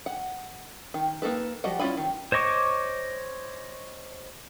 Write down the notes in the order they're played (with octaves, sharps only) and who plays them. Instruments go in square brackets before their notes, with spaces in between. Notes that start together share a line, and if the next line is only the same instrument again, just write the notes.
[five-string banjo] F#5
D#3
A#3 C4 D#4 A4 B4
F3 G3 F#4 D#5 F#5
C#4 E4 F4 G#5 B5
D#3
[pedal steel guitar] C5 C#5 D#5 C#6 D6